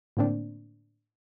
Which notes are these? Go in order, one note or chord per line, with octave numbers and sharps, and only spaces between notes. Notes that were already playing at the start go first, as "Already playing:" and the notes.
A2 D3 A#3 C4 D4